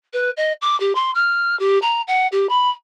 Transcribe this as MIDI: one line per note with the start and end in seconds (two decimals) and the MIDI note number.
0.13 0.30 71
0.37 0.53 75
0.62 0.78 86
0.80 0.93 67
0.95 1.11 84
1.15 1.58 89
1.60 1.79 67
1.82 2.02 82
2.07 2.27 78
2.32 2.47 67
2.49 2.71 83